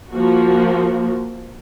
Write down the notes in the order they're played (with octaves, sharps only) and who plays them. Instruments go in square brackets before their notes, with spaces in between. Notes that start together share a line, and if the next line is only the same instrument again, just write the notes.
[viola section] F3 A#3 F#4